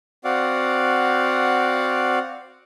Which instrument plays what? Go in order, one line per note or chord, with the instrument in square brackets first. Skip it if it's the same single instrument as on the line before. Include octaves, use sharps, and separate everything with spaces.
[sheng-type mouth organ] C4 F#4 D5 F5 F#5